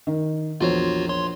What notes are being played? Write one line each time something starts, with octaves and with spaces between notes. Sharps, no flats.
D#3
A#1 E2 F4 F#4 C5 C#5
C#5 C6